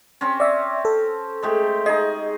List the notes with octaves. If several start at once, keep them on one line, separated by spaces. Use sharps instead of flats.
C4 C#4
D5 E5
A4
G#3 A3 G4
D#4 G#4 D#5